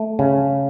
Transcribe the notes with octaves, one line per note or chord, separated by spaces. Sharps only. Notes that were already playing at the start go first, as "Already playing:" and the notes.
Already playing: A3
C#3